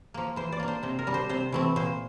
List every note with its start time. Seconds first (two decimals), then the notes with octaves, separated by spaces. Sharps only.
0.14 F3 A#3
0.36 E3 C5
0.52 D5
0.59 A#3 D4
0.68 C5
0.83 C3 C5
0.99 A#4
1.07 G3 D4
1.14 C5
1.29 C3 C5
1.52 E3 A3 C4
1.76 A#2 C5